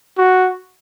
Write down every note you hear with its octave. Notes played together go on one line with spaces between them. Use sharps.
F#4